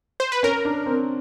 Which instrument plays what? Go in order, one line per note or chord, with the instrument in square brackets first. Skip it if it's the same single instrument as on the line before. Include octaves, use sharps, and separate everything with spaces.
[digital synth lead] C5
B4
[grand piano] C#4 [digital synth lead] A#4
[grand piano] D4
C4